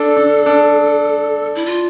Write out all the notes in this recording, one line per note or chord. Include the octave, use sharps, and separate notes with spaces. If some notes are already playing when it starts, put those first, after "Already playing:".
Already playing: D4 A4
D4
D4
E4
F4